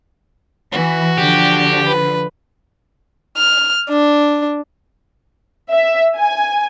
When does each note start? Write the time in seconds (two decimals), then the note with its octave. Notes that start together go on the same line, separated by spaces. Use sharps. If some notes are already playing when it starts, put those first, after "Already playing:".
0.72 E3 F#4
1.18 D3 F3 G4
1.86 B4
3.38 F6
3.90 D4
5.70 E5
6.17 G#5